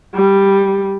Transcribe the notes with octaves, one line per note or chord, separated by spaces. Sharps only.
G3